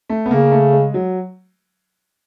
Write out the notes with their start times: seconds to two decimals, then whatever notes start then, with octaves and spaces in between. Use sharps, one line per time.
0.10 A3
0.26 B3
0.30 C#3 A#3
0.52 A3
0.73 G#3
0.94 F#3